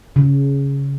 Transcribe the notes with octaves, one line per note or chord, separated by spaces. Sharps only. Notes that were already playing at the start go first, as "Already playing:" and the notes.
C#3